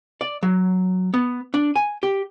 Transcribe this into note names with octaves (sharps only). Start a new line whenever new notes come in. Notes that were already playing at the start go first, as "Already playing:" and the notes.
D5
F#3
B3
D4
G#5
G4